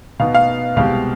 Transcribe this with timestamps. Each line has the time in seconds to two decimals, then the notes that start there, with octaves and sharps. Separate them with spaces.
0.20 B2 B3 D#4 F5
0.35 F5
0.76 C2 B2 G#3 C4 G4 F5